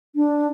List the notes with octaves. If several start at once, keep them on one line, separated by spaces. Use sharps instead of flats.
D4